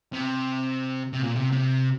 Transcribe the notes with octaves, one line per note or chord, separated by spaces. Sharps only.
C3
C3
A#2
C3
C3